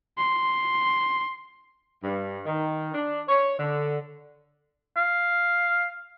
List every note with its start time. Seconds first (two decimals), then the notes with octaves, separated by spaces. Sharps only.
0.18 C6
2.04 G2
2.46 D#3
2.94 D4
3.28 C#5
3.59 D3
4.97 F5